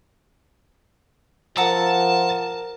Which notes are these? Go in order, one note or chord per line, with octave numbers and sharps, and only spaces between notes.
F3 A#4 F#5 A5 A#5 E6